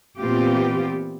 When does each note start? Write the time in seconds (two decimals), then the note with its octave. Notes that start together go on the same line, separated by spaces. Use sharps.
0.21 A#2 E3 B3 C4 F4 G4